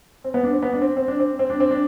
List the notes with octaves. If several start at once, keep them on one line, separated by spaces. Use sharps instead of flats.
C4
B3
D4
C4
B3
D4
C4
C4
D4
C4
C4
D4
C4
D4